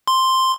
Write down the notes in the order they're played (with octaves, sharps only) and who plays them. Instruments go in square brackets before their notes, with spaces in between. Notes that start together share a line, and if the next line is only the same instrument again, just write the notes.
[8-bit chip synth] C6